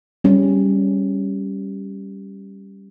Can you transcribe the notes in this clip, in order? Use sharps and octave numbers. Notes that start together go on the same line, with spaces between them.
G3 C#4